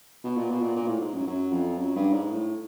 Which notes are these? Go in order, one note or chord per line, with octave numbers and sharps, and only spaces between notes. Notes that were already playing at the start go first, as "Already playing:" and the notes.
B2
A#2
B2
A#2
A#2
A2
G#2
F#2
F#2
F2
F#2
G2
G#2
A2